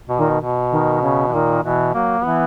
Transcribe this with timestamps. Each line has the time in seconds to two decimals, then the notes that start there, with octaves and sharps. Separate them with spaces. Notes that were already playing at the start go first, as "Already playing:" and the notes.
0.09 B2
0.17 A#2 D#3
0.29 B2
0.40 B2
0.71 D#3
1.02 C#3
1.28 E3
1.33 A#2 D#3
1.63 B2 E3
1.94 F#3 A#3
2.21 F#3
2.25 E3 B3